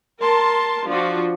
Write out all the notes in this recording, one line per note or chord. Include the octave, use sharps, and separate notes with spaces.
A#4 A5 C6
F3 D4 F4 F#4